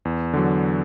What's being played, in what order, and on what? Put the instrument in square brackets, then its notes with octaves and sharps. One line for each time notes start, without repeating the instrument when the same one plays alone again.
[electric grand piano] E2
D3 F#3